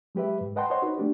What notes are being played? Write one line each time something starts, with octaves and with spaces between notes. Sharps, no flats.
F#3 G#3 G4 B4 E5
G#2
B4 D#5 F#5 G5 A5 C6
C5 C#5 D#5 F#5 C6
D#4 F#4 B4
A3 D4 G4